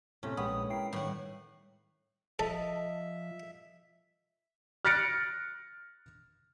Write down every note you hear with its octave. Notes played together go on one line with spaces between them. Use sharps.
A2 C3 A3 C#4
A#1 G#3 B3 C#5 G5 D#6
E4 A#4 G5 C7
A2 D#3 G3 F#5 G5
F3 A4 D#5 E5
F6 F#6 A6 A#6 C#7 D7